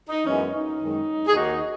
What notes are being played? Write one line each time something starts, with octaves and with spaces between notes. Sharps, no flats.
D#4
F#2 E3 G#3 B3 C#4
D#4
F#2 D#3 G#3
G#4
D#2 D#3 A#3 D#4 F#4